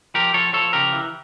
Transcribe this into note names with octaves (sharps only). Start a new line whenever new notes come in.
F3 G4 A#4
F3 A4 C#5
F3 A4 C#5
C#3 G4 A#4
E3